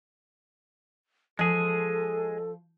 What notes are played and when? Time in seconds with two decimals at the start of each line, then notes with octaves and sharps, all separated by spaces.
1.39 F3 G#3 G#4 A4